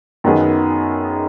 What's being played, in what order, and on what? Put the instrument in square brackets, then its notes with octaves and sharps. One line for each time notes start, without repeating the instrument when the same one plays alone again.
[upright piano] F#2 D#3 B3 G#4